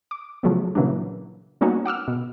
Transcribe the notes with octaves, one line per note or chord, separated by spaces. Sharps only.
D6
C#3 F3 F#3 A3 B3
A#2 C#3 E3 F#3 G3 D4
G3 A#3 B3 C#4 D#4 F#4
F#5 D6 E6 F6
B2